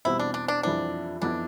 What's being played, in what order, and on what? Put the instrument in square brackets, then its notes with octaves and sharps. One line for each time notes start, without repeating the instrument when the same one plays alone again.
[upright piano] E2 B2 G3 C4 [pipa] E4
[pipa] D4
D4
D4
[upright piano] F2 E3 G3 C4 E4 [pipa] D4
[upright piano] F2 E3 B3 E4 [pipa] D4